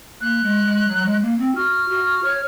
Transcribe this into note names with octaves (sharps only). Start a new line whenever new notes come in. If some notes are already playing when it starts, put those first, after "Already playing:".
A#3 F#6
G#3
G#3
F#3
G#3
A#3
C4
F#4 F6
F#4
C#5